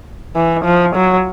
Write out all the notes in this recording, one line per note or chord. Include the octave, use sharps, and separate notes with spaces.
E3
F3
F#3